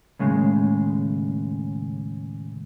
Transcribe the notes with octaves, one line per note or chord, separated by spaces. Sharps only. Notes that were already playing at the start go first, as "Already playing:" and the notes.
D#2 A2 C#3 G#3